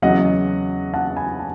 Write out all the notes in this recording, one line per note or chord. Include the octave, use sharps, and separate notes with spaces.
E2 C#3 F#3 D#5 F#5
F#5 A5
G#5 B5
A5